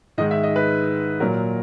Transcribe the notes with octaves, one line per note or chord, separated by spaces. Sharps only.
G#2 D#3 G#3 D#5
E5
D#5
B4
A#2 F#3 A#4